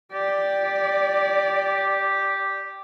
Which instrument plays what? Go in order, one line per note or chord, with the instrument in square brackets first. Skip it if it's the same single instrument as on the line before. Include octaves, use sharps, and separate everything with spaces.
[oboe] G4 [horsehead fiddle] D5